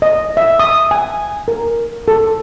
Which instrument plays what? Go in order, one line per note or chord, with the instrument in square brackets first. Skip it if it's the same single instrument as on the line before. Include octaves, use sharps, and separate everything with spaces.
[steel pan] D#5
E5
D#6
G#5
A#4
A4